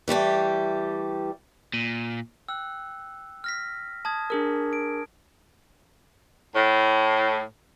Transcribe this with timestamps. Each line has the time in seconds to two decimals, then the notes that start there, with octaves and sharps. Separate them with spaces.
0.08 E3 G3 A3 G4
1.74 A#2
2.48 G5 E6 F#6
3.44 F6 A#6 B6
4.05 A5 D#6 G#6
4.30 D4 G#4 A#4
4.73 D7
6.54 A2